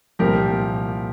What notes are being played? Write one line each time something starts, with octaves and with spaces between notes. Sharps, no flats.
C2 A#2 F3 G4 A#4